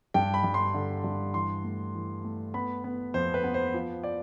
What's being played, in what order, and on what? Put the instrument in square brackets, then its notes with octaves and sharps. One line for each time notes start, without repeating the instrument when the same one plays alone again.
[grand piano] G2 G5
B5
G2
C6
D3
G2
E3 C6
A3
E3
A3
B3 B5
B3
F2 C5
B4
B3
C5
F3
D5